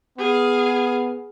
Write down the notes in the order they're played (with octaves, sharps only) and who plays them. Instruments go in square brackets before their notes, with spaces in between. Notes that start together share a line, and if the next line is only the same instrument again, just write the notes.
[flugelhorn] B3 [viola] G#4 F5